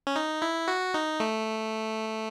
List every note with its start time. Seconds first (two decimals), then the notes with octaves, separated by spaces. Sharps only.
0.07 C#4
0.16 D#4
0.42 E4
0.68 F#4
0.94 D#4
1.20 A3